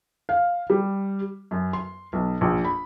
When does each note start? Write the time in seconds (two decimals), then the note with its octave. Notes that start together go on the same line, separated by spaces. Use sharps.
0.29 F5
0.70 G3
1.51 F#2
1.73 C6
2.13 B1
2.41 A#1
2.64 B5